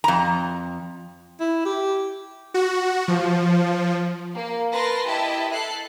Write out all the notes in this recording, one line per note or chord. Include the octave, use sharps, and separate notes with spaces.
F2 A#5
E4
G4
F#4
F3
A#3
A#4 B4 A5 C6 A#6
E4 G4 D#5 E5 A5
A4 F#6 C7